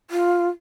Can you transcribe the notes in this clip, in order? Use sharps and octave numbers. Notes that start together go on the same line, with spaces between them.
F4